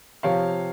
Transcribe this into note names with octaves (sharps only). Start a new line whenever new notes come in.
C3 F3 C4 C#5 F5